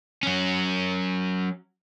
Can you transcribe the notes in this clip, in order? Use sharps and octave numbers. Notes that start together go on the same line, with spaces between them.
F#3 C#4